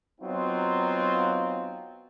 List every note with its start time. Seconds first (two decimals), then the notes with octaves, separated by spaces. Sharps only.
0.21 F#3 B3 C4 D#4 F4